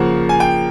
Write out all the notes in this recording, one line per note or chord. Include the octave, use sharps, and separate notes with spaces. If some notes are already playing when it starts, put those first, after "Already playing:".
Already playing: C#3 F3 A#3 F#5
G#5
G5